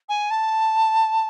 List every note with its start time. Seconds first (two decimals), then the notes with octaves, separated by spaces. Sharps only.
0.09 G#5
0.31 A5